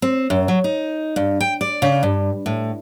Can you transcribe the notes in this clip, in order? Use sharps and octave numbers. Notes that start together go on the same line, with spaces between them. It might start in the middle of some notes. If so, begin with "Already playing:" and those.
C4
F#2
F#3
D#4
G2
G5
D5
C#3
G2
A2